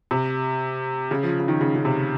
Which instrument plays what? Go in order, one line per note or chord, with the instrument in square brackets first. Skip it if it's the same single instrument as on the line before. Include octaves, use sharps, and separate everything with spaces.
[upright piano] C3
C#3
F3
C#3
D#3
C#3
C#3
C3